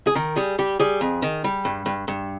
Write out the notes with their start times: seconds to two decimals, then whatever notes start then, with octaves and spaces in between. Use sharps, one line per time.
0.07 G#4
0.15 D#3 A#4
0.36 G3 G#4
0.59 G3 G4
0.80 G3 G#4
1.01 F2
1.22 D#3
1.44 G3
1.65 G2
1.86 G2
2.08 G2